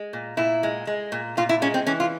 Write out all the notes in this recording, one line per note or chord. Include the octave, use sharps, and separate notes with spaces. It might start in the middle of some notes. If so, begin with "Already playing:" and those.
Already playing: G#3
A#2
A#2 E4
G#3
G#3
A#2
A#2 F4
E4
G#3 C#4
C4
E3 C#4
F4